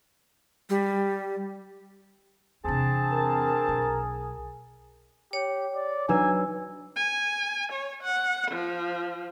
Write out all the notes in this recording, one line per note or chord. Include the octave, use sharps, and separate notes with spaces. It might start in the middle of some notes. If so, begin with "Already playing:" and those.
G3
E2 C3 C4 D4 G#4 A5
A#4
B1
G4 C#5
D5
F#3 D4 D#4 B4 G#5 E6
G#5
C#5
F#5
F3